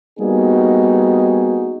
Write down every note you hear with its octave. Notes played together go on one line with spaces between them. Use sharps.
G3 A#3 B3 D#4 F#4 G#4